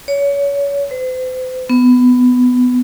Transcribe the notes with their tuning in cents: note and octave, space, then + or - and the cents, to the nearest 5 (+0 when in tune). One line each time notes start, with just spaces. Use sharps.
C#5 +30
C5 -40
B3 +15